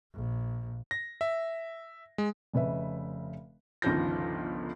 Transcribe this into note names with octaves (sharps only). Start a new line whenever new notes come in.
A#1
A#6
E5
G#3
F1 C#3 B4 E5
G1 C#2 D#3 F3 G6 A#6